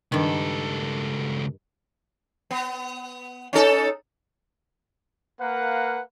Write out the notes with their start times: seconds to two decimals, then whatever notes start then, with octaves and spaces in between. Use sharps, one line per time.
0.12 C#2 G2 D#3 A4
2.51 B3
3.53 C#4 D#4 A4
5.40 A#3 A#4 B4 F5 F#5